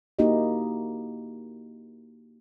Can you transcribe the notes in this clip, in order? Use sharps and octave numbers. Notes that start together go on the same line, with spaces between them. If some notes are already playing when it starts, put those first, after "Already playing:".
A#3 D#4 E4 F#4 G4 D#5